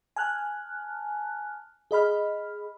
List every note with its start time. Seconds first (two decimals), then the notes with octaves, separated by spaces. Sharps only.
0.16 G#5 A5 F6 F#6
1.91 G#4 D#5 B5 F6